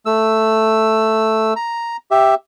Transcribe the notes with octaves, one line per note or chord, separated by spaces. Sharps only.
A3 E6
A#5
G4 E5